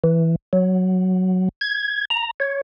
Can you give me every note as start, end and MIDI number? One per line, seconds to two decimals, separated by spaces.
0.04 0.36 52
0.53 1.49 54
1.61 2.05 92
2.10 2.31 82
2.40 2.61 73